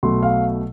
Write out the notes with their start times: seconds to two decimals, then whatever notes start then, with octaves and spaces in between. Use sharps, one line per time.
0.03 B1 B2 A3 C6
0.23 F5